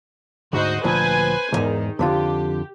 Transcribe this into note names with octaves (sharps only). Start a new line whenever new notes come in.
D2 G#2 F#4 C5 D#5
D2 A#2 F3 B4 C5 G#5
B1 E2 G#2 D#3
F2 D3 F4 G4